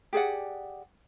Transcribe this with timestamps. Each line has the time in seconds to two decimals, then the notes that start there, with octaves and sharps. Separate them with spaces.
0.13 G4 G#4 D5 F#5